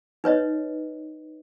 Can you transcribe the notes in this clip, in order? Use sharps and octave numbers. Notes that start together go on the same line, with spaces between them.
D#4 B4 C#5 D#5